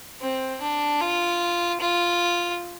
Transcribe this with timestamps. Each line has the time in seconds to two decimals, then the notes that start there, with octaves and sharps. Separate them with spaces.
0.21 C4
0.62 D4
1.01 F4
1.81 F4